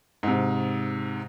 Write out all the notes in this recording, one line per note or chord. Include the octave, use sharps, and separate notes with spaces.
G#2 C3